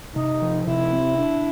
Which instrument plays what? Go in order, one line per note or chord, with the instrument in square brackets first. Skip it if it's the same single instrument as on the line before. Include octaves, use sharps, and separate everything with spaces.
[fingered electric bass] C3 [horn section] D#4
[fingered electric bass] F3
[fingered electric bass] C3 [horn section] E4
[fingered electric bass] C4
D4